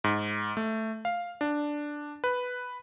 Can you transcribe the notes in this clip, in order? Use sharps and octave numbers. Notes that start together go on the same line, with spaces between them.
G#2
A3
F5
D4
B4